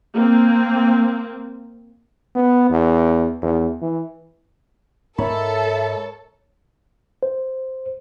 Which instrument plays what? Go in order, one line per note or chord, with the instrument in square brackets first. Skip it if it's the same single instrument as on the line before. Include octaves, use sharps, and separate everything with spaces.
[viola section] A#3 C4
[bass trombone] B3
E2
E2
E3
[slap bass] G#2 G#3 [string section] A4 [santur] A#4 C#5 B5 [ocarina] E5
[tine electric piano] C5